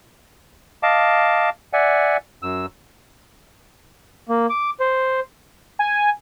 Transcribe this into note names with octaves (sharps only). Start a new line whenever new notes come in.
D#5 F5 A5 D6
D5 E5 F#5 G#5
F#2 E6
A#3
D6
C5
G#5